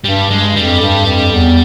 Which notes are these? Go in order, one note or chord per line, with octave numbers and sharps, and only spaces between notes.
G2 G3
G2 G#3
F2 G3
G2
F2
E2